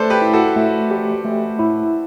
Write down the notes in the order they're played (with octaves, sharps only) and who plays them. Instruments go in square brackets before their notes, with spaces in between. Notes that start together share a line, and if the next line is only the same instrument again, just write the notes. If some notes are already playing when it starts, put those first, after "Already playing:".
Already playing: [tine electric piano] A3 [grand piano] A4 B4 C5 D5
[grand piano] G4 B4
[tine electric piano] E4
[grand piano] F#4 A4
[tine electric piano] A3
G4
A3
E4